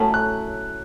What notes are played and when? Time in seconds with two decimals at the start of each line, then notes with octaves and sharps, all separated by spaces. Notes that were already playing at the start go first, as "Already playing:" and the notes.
Already playing: A2 F#3 A3 C#4
0.14 F#6